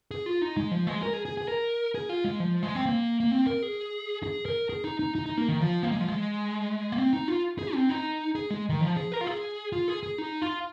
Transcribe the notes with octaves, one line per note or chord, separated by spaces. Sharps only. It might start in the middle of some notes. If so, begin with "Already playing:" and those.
G#4
F4
D#4
G#3
F3
G#3
A#4
G#4
G#4
G#4
A#4
G#4
F4
G#3
F3
G#3
C4
A#3
A#3
C4
A#4
G#4
G#4
A#4
G#4
D#4
D#4
D#4
D#4
A#3
D#3
F3
A#3
G#3
F3
G#3
A#3
C4
D#4
F4
G#4
C4
D#4
G#4
G#3
D#3
F3
G#4
A#4
F4
G#4
F4
G#4
G#4
D#4
F4